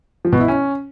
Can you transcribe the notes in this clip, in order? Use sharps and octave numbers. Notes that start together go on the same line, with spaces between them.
F3
B2
E4
C#4